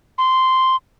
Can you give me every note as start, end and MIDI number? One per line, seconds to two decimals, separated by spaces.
0.18 0.76 84